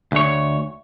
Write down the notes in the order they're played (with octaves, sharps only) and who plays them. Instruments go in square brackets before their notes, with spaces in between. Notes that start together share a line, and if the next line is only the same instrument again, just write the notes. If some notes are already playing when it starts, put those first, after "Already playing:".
[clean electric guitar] D2 C#5